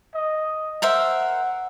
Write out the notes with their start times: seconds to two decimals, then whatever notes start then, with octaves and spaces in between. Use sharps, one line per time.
0.15 D#5
0.82 A#4 C5 E5 F#5